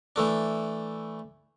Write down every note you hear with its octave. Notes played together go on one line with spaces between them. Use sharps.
E3 A3 D4